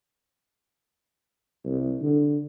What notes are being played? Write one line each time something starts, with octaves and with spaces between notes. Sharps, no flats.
C2
D3